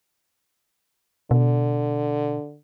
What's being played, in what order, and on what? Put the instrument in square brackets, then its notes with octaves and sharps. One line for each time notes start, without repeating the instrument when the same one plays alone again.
[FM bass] B2 [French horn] D3